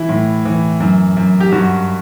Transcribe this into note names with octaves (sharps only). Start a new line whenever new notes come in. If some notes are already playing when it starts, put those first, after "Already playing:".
Already playing: E3 E4
A2
E3
F#2
F#2
G4
G2 F#4